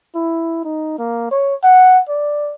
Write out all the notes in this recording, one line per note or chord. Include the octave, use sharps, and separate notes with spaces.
E4
D#4
A#3
C#5
F#5
D5